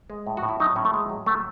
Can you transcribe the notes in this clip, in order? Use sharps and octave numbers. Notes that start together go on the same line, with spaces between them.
G#3
A2
F#4
A2
E4
F#3 D#4
A2 C#4
A3
F#3 G#3
F#3
A2 A3